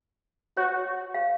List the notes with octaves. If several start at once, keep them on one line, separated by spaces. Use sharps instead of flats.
F#4 C#5
F5